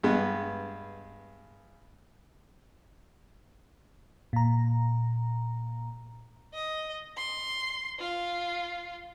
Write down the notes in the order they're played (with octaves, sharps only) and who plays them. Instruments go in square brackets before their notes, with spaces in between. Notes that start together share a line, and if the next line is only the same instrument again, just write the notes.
[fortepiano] G2 G#3 B3
[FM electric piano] A#2 A#5
[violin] D#5
C6
F4